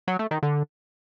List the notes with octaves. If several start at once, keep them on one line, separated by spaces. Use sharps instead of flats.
F#3
A3
D#3
D3